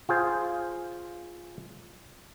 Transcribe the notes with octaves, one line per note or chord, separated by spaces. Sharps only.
F4 G#4 C5